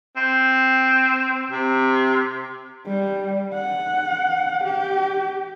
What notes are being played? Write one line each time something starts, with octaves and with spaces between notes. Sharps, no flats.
C4
C3
G3
F#5
G4